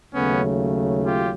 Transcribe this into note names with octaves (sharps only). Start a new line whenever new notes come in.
D#2 C#3 F#3 A3 B3 C#4
F4 G4